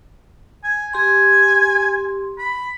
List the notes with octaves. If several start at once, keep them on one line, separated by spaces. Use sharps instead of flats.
G#5
G4 G#5 C6
B5